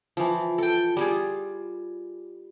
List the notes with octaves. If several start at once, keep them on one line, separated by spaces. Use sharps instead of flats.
E3 F3
A4 G5
G3 F4 G#4